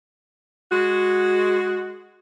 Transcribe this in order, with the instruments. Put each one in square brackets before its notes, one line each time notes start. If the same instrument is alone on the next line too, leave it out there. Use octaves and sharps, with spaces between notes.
[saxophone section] G#3 F#4